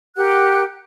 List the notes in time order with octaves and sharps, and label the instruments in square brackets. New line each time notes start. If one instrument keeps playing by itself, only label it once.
[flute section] G4 A#4 F#5 F#6